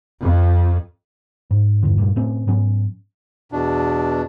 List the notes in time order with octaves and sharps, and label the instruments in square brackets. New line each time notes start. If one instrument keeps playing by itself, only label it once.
[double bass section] F2
[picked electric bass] G#2
E1 G2 D3
G2 A#2
A2 C4 C#4
G#2 F#3 B3 C#4
[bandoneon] E2 B2 D4